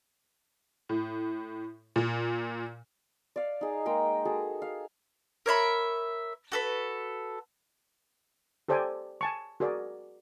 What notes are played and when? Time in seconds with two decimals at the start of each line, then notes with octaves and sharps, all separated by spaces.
0.89 A2
1.96 A#2
3.36 D5 F5
3.61 D#4 G#4
3.85 G#3 A#3 G5 A#5
4.25 F#4 G#4 A4
4.62 F5
5.46 A#4 C#5 E5 B5
6.52 F#4 A4 B4
8.68 G4 A4 C5 D5 G5 G#5
9.21 G#5 A5 C#6
9.60 F#4 G#4 A#4 D5